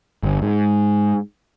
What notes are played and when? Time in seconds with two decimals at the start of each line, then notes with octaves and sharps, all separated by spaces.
0.23 G1
0.42 G#2